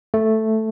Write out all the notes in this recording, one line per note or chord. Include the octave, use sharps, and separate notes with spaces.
A3